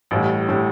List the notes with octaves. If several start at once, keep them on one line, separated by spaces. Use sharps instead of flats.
A1 A2 G3
A2 G3